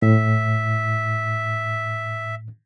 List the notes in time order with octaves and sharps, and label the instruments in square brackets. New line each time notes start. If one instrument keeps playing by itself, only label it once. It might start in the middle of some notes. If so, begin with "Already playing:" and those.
[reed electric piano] A2 [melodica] E5